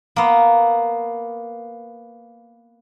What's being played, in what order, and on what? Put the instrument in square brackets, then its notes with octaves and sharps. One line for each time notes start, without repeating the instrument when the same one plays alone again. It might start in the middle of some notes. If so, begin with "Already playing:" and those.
[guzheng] A#3 B3